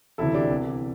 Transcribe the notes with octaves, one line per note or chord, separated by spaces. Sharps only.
E1 D2 C3 E3 E4 A4
D4 G4
C2 C3 E3